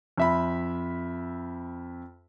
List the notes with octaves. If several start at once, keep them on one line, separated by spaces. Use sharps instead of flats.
F2 E5 B5